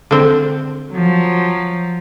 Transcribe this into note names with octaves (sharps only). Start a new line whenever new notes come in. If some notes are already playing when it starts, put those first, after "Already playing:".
D3 C4
F3 F#3